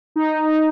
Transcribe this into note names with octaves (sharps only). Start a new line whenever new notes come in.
D#4